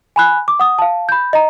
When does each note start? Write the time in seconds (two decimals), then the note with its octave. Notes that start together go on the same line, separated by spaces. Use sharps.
0.16 G#5 B5 F#6
0.48 D6
0.60 F#5 D#6
0.79 F5 A5
1.09 B5 G6
1.33 D#5 A#5